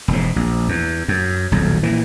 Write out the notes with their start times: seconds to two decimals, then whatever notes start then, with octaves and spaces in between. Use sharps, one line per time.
0.08 E1 G#2
0.36 A#1
0.69 E2
1.08 F#2
1.52 D#1 B1 F2
1.83 A#2 E3